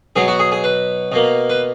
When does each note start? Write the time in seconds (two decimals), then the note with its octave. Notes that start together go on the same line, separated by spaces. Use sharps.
0.16 B2 F#3 B3 G#4
0.28 F#4
0.39 G#4
0.52 G#4
0.64 B4
1.12 B2 A#3
1.50 B4